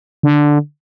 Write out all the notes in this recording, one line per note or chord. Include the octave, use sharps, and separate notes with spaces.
D3